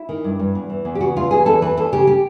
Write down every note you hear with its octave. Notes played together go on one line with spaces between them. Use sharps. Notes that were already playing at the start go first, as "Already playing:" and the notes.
Already playing: E4
D#3
G2
G2
E2
E3
E2
G4
C#3 F#4
E2 F4
E3 G#4
E2 A4
E3 B4
E2 A4
C#3 G4
G4